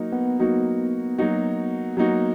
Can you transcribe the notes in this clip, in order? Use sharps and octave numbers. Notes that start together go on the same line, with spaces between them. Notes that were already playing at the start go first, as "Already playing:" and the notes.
Already playing: F#3 A#3 D#4 F#4
B3
F#3 A#3 D#4 F#4
F#3 A#3 D#4 F#4
F#3 A#3 B3 D#4 F#4